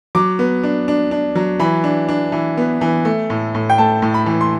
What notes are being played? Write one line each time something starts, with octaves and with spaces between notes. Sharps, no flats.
F#3 D6
B3
D4
D4
D4
F#3
E3 B5
D4
D4
E3
B3
E3
A3
A2
A2
G5
A3 A5
A2
B5
E3
C6